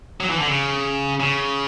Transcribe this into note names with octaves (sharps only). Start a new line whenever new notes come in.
F#3
E3
D3
C#3
C#3